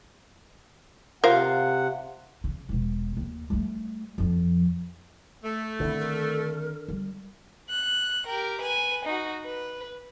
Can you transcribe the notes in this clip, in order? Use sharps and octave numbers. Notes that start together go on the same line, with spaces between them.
C3 F4 A#4 C5 F5 F#5
C#3
E1 B2
D#2
G3 A3
F2 F3
A3
D3 D#3 C4 E4
A#4
G3
F#6
G4 A#4
B4 G#5
D#4 F#4
B4